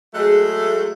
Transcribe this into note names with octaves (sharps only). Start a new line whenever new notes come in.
F#3 G#3 A3 G#4 F#6